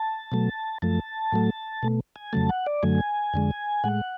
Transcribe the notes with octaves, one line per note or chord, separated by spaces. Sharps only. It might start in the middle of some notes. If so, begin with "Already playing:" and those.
Already playing: A5
B2 F#3 A3
F#2 F3 A3 A5
A2 F#3 A3
B2 A3
G#5
F2 C#3 F#3 A3 A5
F#5
D5
F#2 D3 F#3 A3 G#5
F2 D3 G#3
A2 G#3 F#5